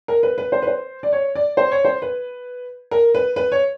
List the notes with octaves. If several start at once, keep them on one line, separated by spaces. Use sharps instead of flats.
A#4
B4
B4
C5
B4
C5
D5
C#5
D5
C5
C#5
C5
B4
A#4
B4
B4
C#5